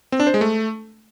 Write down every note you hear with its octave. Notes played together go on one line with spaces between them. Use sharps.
C4
D4
C5
G#3
A3